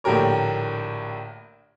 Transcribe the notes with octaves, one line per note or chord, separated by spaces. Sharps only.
A#1 A2 D3 G4 A#4 C#5